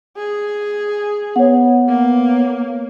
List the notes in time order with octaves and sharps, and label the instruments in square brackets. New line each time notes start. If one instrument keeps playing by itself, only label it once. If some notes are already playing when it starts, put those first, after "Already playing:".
[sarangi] G#4
[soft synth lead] B3 [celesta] C#5 F#5
[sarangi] A#3